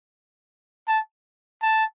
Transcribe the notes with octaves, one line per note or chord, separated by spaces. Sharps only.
A5
A5